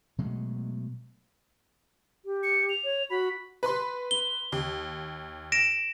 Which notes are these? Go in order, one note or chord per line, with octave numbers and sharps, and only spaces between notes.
B2 F#3 G#3 A3
G4
C#7
F7
C#5
F#4 B5
B4 B5 C6
G7
D#2
A#6 D7 E7